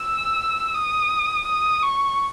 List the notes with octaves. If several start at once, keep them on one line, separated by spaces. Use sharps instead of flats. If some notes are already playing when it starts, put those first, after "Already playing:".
Already playing: E6
D#6
D#6
C#6